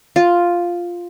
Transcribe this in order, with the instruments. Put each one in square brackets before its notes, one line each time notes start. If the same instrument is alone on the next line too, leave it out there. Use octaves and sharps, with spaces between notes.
[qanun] F4